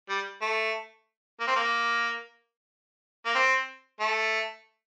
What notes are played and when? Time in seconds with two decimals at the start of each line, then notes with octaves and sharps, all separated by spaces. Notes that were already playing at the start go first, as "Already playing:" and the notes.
0.09 G3
0.42 A3
1.40 A#3
1.47 C4
1.56 A#3
3.26 A#3
3.35 C4
4.00 A3